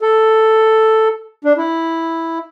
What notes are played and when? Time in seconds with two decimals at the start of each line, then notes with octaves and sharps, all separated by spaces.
0.01 A4
1.45 D4
1.57 E4